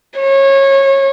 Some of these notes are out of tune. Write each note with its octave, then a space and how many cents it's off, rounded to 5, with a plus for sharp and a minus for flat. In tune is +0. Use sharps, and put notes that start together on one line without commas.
C#5 -25